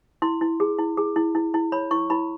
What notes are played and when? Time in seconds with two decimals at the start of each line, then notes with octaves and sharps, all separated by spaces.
0.22 E4 C6
0.41 E4
0.60 G#4
0.78 E4
0.97 G#4
1.16 E4
1.35 E4
1.54 E4
1.72 C#5 B5
1.91 E4 C#6
2.10 E4 B5